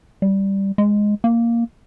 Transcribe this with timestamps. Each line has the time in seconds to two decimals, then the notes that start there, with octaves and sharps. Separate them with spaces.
0.22 G3
0.78 G#3
1.24 A#3